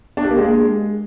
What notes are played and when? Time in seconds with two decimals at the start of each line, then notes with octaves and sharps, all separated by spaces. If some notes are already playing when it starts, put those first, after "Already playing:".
0.17 D4
0.24 G4
0.31 A#3
0.38 G#3